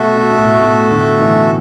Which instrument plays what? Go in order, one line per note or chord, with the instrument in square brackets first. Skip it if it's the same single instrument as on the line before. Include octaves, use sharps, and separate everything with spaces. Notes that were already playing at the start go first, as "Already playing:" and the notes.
Already playing: [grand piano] B2 [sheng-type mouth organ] A3 F#4 A4 E5
[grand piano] B2
B2
A2
B2
A2 D3
B2 E3